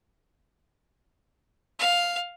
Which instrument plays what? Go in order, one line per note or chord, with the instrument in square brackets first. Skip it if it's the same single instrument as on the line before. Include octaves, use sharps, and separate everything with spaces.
[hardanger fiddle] F5